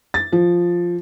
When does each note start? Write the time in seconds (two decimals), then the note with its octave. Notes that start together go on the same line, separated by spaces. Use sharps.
0.14 A6
0.32 F3